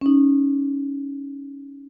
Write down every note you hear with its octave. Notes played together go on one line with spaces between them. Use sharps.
C#4 D#4